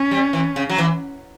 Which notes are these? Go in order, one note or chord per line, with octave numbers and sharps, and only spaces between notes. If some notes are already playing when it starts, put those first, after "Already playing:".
Already playing: C#4
G3
E3
C#3
F#3
E3